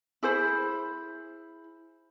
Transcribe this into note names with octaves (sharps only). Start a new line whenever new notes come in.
E4 G#4 C5 B5